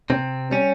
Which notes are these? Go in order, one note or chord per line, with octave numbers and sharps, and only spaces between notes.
C3 C4
G3 C#4